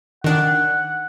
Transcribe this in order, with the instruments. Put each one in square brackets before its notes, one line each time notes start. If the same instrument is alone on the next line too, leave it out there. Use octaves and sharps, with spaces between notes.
[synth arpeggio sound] D#3 D4 [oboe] F#5